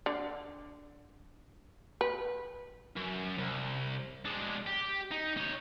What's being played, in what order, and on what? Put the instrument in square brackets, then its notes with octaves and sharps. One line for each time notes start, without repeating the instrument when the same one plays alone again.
[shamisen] D3
B4
[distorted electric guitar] F#2
C2
G#3 D4
G4
D#4
D#4 C#5